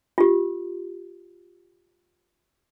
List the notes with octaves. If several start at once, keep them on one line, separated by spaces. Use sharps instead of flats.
F4 G4